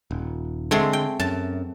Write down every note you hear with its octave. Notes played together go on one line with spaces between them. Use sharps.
D#1
D3 G#3 A3 C4
G5
F#2 A5